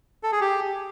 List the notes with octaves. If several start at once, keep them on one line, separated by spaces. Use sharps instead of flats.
A4
G#4
G4